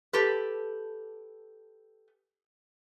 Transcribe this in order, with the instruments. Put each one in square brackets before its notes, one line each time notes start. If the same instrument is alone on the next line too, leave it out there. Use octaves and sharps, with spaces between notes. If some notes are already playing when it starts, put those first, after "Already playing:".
[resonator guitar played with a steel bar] G4 A4 B4